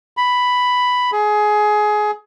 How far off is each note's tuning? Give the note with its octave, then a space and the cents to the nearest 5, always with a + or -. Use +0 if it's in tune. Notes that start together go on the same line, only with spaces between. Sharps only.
B5 +5
G#4 +20